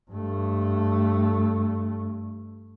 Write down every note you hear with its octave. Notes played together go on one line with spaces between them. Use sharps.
G2 A3